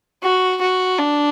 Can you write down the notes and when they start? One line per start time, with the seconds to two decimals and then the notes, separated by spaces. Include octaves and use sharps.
0.22 F#4
0.61 F#4
0.98 D4